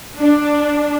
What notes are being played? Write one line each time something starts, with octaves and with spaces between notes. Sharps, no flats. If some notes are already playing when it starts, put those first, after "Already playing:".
D4